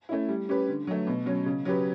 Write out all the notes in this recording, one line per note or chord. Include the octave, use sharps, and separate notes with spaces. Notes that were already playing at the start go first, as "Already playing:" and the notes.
A3 C#4 E4
G3
C#4 G4 B4
D3
F#3 A3
B2
F#3 C#4
C#3
F#3 C#4 G4 B4